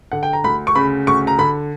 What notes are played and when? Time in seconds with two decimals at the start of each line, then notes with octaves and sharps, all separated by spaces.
0.12 D3 F#5
0.23 G5
0.33 A#5
0.44 D2 B5
0.67 C#6
0.75 C#3 B5
1.07 D2 C#6
1.27 A#5
1.38 D3 B5